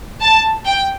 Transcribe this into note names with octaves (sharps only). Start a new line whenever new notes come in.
A5
G5